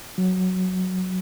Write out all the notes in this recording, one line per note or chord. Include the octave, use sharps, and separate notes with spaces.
F#3